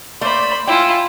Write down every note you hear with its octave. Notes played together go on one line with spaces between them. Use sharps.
A3 A#3 C5 D5 B5
E4 F4 G5 G#5